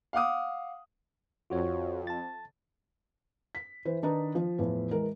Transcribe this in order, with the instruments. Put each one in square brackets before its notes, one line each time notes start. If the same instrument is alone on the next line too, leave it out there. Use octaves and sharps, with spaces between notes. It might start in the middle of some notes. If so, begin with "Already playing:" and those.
[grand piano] F5 F#5 D6 D#6
[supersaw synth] F2 [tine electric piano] F4 F#4 C#5
[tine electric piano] A5 A6
[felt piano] B6
E3 C5
D#3 D4 D#4 B4
F3
E2 A2 F3
E3 G#3 A#4